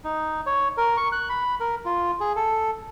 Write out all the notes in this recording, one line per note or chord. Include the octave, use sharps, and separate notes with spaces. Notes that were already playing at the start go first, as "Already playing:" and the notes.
D#4
C#5
A#4
C#6
F#6
B5
A#4
F4
G#4
A4